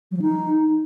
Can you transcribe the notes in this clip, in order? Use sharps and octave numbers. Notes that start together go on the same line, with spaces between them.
F#3
F3
D#4